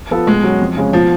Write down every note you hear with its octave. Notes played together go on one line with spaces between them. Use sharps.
F3 B3 F4 A4
B2 G#3
F#3 C#4 F#4
F2
C#3 G#3 C#4
B2 F3